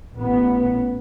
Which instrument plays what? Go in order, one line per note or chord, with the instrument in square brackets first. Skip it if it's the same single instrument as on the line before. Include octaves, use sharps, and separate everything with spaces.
[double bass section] A1 B3